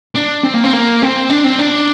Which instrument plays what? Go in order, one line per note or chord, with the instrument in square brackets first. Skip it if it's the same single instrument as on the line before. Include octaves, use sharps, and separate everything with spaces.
[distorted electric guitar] D4
C4
A#3
C4
A#3
C4
D4
C4
D4